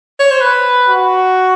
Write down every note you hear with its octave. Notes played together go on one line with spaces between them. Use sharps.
C#5
C5
B4
F#4